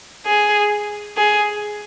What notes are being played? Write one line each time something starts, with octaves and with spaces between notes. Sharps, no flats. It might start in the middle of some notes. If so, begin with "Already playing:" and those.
G#4
G#4